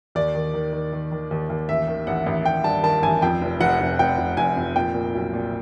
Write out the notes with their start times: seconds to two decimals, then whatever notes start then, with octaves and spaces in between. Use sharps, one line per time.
0.15 D#2 D5
0.35 D#3
0.54 D#3
0.73 D#3
0.93 D#3
1.12 D#3
1.31 D#2
1.50 D#2
1.69 A1 E5
1.88 D#3
2.07 A1 F#5
2.26 A1
2.45 A1 G5
2.64 G2 A5
2.83 D#3 A5
3.03 A1 G#5
3.22 F2 G5
3.42 F1
3.60 F1 F#5
3.80 F1
3.99 F1 G5
4.18 F1
4.37 F1 G#5
4.57 F2
4.76 A#2 G5
4.95 A#2
5.15 B1
5.33 A#2